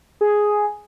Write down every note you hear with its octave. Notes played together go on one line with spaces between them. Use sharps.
G#4